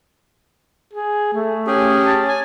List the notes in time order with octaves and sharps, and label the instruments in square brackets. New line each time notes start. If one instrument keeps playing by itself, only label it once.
[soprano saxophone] G#4
A3
[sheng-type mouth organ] C#4 G4 G#4
[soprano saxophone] A5
[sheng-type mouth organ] G#5